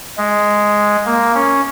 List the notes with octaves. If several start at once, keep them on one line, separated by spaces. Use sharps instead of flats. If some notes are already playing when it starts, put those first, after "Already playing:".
G#3
A#3
C#4